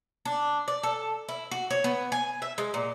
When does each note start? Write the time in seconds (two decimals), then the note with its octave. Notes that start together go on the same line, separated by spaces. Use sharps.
0.25 D4
0.68 D5
0.83 A4
1.29 E4
1.51 F#4
1.70 C#5
1.84 B3
2.12 G#5
2.42 E5
2.58 G#3
2.74 A#2